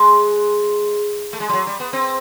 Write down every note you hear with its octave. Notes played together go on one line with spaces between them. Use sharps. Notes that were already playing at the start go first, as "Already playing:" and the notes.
Already playing: G#3
A3
G#3
G3
F#3
G3
B3
C4